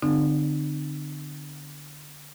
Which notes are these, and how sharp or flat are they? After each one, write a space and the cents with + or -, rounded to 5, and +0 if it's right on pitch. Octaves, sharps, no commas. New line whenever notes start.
D3 +0 C4 -25 D#4 -35